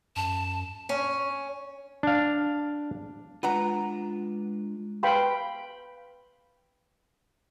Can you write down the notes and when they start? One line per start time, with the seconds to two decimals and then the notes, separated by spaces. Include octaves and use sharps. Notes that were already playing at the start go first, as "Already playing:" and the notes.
0.16 F#2 A5
0.89 C#4
2.03 D4 F5
3.43 G#3 D4 F4 B4 F#5 A#5
5.03 B4 F5 G5 B5 C6